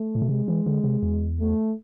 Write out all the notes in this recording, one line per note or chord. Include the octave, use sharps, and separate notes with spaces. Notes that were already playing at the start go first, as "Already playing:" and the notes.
Already playing: A3
A2
B2
C3 G#3
E3
D3
C3
E2
A3